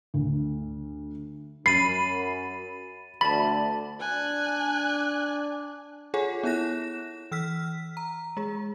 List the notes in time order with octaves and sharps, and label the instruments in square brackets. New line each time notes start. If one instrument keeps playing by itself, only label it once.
[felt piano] D2
[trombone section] F#2 [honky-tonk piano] B5 [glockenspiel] A6 D#7 [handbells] C7
[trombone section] D2 [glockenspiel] A5 A6 [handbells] B5
[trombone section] D4 [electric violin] G#5 F#6
[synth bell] F4 G#4 A4 C#5 F#5 G#5
B3 E4 C#5 F#6 A#6 E7
E3 E6 F6 B6
A#5
G#3 G#4